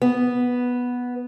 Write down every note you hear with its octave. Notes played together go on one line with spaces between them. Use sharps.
B3